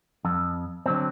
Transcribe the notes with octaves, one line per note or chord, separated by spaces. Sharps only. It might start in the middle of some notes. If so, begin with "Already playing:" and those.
F2
D3 F#3 C4